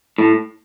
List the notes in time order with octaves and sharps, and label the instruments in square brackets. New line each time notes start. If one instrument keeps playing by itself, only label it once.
[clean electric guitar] A2